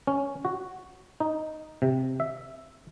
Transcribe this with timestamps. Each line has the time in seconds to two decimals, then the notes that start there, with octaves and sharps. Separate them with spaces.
0.07 C#4
0.45 F#4
1.20 D#4
1.82 C3
2.20 E5